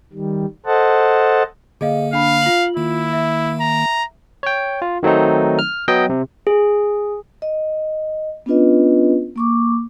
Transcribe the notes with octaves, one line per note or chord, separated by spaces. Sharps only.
D#3 G3
A4 C5 D#5 F#5 A5
D3 A#3 G#4 D#5 F5
D4 F5 B5
F4 F#7
D#3 A#3 E4
E5
A#5
C#5 G5
F4
D#3 F#3 A3 C4 D#4
F6
F#3 B3 D#5 G5
C3
G#4
D#5
B3 C#4 D4 F4 B4 D#5
A#3 C#6 D6